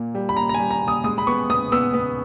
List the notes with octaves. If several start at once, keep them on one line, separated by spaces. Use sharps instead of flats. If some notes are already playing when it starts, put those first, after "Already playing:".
Already playing: A#2 A#3
G3
B5
A#2 A#5
A#5
G3 G#5
A#5
A#2
D#6
G#3 D#6
B5
B3 C#6
B3 D#6
B3 E6
B3